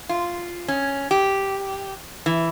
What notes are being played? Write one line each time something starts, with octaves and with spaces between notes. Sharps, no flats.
F4
C#4
G4
E3